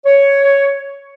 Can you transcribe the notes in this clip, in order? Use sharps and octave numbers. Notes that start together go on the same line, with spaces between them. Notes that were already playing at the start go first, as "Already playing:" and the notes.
C#5